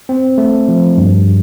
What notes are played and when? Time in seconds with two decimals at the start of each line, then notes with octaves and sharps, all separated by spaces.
0.09 C4
0.38 A3
0.68 F3
0.98 G2